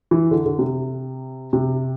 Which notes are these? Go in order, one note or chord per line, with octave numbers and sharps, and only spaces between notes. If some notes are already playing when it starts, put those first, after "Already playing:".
E3
D3
D3
C3
C3